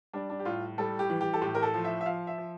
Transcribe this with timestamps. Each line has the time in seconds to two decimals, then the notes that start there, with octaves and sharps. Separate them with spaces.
0.13 G3 D4
0.30 D4
0.39 G4
0.45 A2 F4
0.78 G3 A4
0.99 G4
1.10 E3
1.21 G4
1.33 A4
1.42 A2 G4
1.55 A#4
1.63 A4
1.74 F3
1.85 E5
2.01 E5
2.06 F3 F5
2.27 E5
2.38 F3